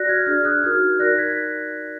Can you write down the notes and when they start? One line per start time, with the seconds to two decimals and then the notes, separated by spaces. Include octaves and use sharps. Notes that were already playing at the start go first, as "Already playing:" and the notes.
Already playing: F#4 D5 F#6 A#6
0.08 F6 G#6
0.26 D4 G#4 D5 F6 G#6
0.45 D#6 F#6
0.63 D#4 F#4 A#4 F6 G#6
0.99 D#4 A#4 D5 F#6 A#6
1.18 G#6 B6